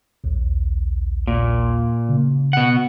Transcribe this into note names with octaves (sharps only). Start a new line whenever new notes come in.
A#1 D#2
A#2
C#3
B2 F#5